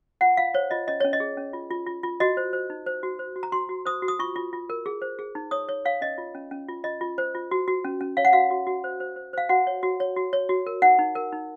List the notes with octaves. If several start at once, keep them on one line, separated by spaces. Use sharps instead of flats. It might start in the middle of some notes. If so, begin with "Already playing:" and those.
F4 F#5
F4 F5
C5 C#5
F4 D#5
C#4 D#5
C#4 C#5
D#5
G#4
C#4
F4
F4
F4
F4
F#4 D#5
C5
C5
D#4
C5
F#4
C5
F#4
A#5
F#4 C6
F#4
C5 D#6
F#4
D#6
F4 C#6
F4
F4
A#4
G#4
C5
G#4
D#4
C#5 D#6
C#5
C#5 F5
C#4 D#5
F4
C#4
C#4
F4
F4 D#5
F4
C5
F4
F#4
F#4
C#4
C#4
C#5 F5
F#5
F#4 F5
F#4
F#4
C5
C5
C5
C5 F5
F#4 F#5
C#5
F#4
C#5
F#4
C#5
F#4
A#4
D#4 F#5
D#4
A#4
D#4